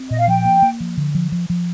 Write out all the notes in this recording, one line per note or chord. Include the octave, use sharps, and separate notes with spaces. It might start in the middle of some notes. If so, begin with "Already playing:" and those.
Already playing: C4
A#2 D#5
F5
F3 G5
A#3
A#3
F3
D3
F3
F3
F3